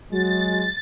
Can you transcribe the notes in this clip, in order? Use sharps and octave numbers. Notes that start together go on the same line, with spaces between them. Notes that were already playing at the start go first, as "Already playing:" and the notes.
F#3 G#3 F#4 A6